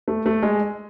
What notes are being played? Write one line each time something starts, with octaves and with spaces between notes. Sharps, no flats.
A3
A3
G#3